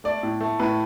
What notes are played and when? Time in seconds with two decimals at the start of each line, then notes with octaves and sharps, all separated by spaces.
0.04 A3 D5
0.23 A2
0.41 A3
0.59 A2 B4